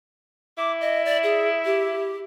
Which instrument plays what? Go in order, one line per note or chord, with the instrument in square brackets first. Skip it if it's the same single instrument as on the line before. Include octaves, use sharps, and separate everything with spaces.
[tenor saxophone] E4 [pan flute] D6
[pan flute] D#5
D5
G#4
G4